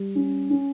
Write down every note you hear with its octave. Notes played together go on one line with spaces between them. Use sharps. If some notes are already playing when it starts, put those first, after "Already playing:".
Already playing: G3
C#4
C#4